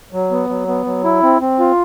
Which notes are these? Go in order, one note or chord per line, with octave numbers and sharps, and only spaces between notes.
F#3
B3
F#3
B3
F#3
E4
C4
C4
F4